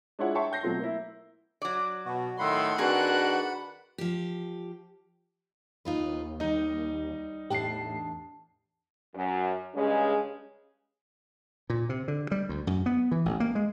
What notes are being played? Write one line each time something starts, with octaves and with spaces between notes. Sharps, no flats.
G#3 D4 E4 F4 C#5 F#5
C#5 E5 G5 A5 C6 C#6
G5 G6 A#6 C7
B2 F#3 A3 C4 F4
A#3 E4
F#3 D5
B2 F#4
A2 D#3 A3 F#5 B5 C6 E6
D#3 C4 D4 F#4 G#4 A#4 B4 F#6
F3 G4
D#2 D#4 F4 B4
G3 D#4 D#5
E2 A2 D4 G4 A5 C7
F#2
G2 C#3 G#3 C#4
A#2
C3
D3
G3
D2
F#2
B3
E3
A1
A#3
G#3